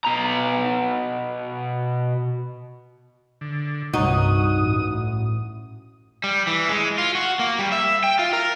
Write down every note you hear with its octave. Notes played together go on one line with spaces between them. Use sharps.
B2 A#5
D3
C2 G2 D#4 F#4 D#6
A1
G3
E3
G#3
F4
F#4
A#3
G3
E5
G5
F4
A#4